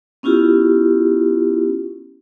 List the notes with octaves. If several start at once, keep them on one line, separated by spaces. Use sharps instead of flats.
B3 C#4 E4 F4 G4